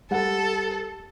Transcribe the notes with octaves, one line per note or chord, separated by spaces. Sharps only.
G3 A4 F#5